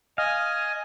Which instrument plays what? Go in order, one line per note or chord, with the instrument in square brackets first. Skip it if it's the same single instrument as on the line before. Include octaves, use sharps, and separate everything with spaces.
[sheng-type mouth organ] D#5 G#5 [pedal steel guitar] F5